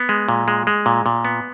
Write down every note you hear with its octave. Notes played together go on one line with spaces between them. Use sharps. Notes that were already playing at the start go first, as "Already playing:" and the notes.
Already playing: B3
G#3
A#2
G#3
G#3
A#2
A#2
B3